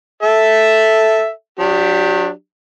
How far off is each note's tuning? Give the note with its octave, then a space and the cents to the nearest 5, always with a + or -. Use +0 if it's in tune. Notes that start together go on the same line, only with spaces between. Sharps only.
A4 +0 E5 +0
F#3 -35 D4 +0 G4 +0